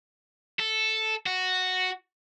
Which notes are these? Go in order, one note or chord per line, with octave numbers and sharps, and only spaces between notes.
A4
F#4